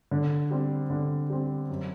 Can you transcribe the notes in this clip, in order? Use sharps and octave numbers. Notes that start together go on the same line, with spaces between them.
D3
G3 C4
D3
G3 C4
F#2